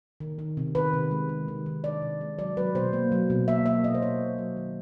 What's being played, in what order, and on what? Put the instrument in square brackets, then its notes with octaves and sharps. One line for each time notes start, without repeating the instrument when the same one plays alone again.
[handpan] D#3
D#3
C3
D#3 B4
C3
G#3
D#3
D#3
D#3
C3 D5
C3
G#3
F#3 D5
F#3 B4
B2 C5
A#3
F#3
B2
A#3 E5
A#3 E5
B2 D#5
C5
B2 C#5
B2
F#3
D#3